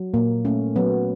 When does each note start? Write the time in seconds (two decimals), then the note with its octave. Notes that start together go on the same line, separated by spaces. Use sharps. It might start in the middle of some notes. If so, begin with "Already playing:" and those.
Already playing: F#3
0.14 A#2 A#3
0.45 A3 C#4
0.76 F#3 B3